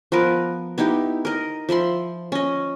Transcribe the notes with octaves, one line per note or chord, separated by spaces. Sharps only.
F3 B3 A#4 B4
B3 D#4 E4 G4
A#4 D#5
F3 E5 B5 C6
C#4 D#5